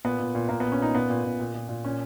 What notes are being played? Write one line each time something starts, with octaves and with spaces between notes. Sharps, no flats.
A#2 B3
A#2
A#2
A#2 A#3
B3
A#2
C#4
A#2 D#4
A#2 B3
A#2
A#2
A#2
A#2
A#2
A#2 C#4